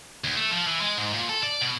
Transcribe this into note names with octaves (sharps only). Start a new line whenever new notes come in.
D2
A3
F3
E3
G#3
G#2
A#2
A4
D5
B2